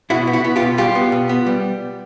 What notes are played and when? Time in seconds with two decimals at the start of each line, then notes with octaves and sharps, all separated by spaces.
0.10 B2 E4 F#4
0.27 B3
0.33 E4 F#4
0.45 B3
0.56 F4 G4
0.61 B2
0.78 G3 F4 G4
0.95 B3
1.12 B2
1.29 B3
1.46 G3